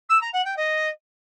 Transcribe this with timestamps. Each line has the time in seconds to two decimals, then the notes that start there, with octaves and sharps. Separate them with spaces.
0.09 E6
0.21 A#5
0.33 F#5
0.44 G5
0.56 D#5